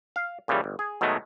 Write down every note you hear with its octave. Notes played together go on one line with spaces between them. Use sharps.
F5
A#2 C#3 E3 G3
G1
G#4
B2 D#3 F#3 G#3 A3